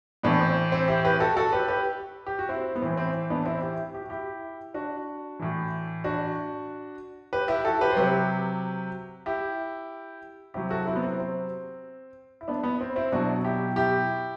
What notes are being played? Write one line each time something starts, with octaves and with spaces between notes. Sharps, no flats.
A2 E3 B3 D4
C4
C4
E4 G4
G4 B4
F#4 A4
F#4 A4
G4 B4
G4 B4
G4
F#4
C4 E4
B3
A2 E3 C4
C4 E4
B3 D4
C4 E4
E4 G4
G4
F#4
E4 G4
D4 F#4
A2 E3
D4 F#4
G4 B4
E4 G4
F#4 A4
G4 B4
C5
C3 F#3 G4 B4
E4 G4
C3 F#3 E4 G4
F#4 A4
C4 E4
B3
C4
C4
E4
B3 D4
B3
C4
C4 E4
B2 F#3 D4 F#4
E4 G4
E4 G4